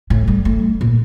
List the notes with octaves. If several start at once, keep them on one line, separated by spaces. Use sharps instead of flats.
A2
G3
A3
A#2